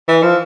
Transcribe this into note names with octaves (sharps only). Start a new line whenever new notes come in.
E3
F3